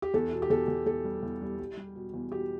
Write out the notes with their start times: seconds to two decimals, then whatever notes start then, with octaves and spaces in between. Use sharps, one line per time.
0.02 G4
0.14 E2 A4
0.32 B2
0.42 G4
0.50 E2 A4
0.68 E2
0.86 E2 A4
1.05 G3
1.23 E2
1.42 G3
1.59 G3
1.77 G3
1.96 B2
2.14 E2
2.32 B2 G4